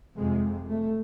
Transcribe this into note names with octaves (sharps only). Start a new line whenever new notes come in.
F2 C3 G#3
A3